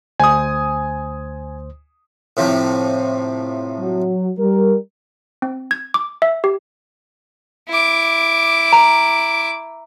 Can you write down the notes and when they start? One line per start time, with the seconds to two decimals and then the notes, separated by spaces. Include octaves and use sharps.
0.20 D2 C5 G#5 D#6
2.37 A2 C3 F3
3.80 F#3
4.38 G3 A#4
5.42 C4
5.71 G#6
5.94 D6
6.22 E5
6.44 G4
7.69 E4 D6
8.73 A#5